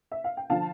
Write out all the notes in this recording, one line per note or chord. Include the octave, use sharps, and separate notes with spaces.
E5
F5
G5
D3 F3 F5 A5